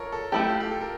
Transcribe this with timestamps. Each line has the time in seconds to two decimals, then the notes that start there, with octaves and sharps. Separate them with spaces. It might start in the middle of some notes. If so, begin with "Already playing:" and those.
Already playing: F4 A4 A#4 C#5
0.12 A4
0.32 A3 E4 G4 A4
0.50 F4
0.60 G4
0.71 A4
0.81 A#4